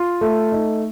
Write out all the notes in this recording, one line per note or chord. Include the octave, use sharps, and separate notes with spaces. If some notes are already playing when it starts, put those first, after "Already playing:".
Already playing: F4
A3
D#4